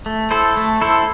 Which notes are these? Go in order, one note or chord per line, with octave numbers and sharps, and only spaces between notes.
A3
E4 A4 C5
A3
E4 A4 C5